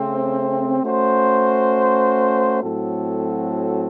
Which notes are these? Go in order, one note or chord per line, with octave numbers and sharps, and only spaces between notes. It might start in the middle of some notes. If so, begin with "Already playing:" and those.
Already playing: C#3 A3 C4
A3 C#4 F#4 C5
A2 F#3 C4 F#4 A4